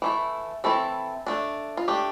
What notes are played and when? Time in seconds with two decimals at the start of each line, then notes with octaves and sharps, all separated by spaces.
0.02 E3 A3 E4
0.64 E3 A3 C4 E4 A4
1.27 A3 D4
1.77 F4
1.88 A3 D4 G4